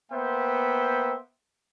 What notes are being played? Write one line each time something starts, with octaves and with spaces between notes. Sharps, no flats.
A#3 B3 C5 E5 G5